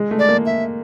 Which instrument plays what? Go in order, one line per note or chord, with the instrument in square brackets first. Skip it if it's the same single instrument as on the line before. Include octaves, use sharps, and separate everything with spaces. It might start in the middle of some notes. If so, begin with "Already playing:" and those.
Already playing: [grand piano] G#3
A3
[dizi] D5
[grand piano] A#3
[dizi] E5